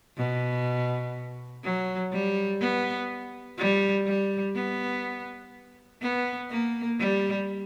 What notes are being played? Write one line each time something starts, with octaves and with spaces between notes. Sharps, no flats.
B2
F#3
G3
B3
G3
G3
B3
B3
A#3
G3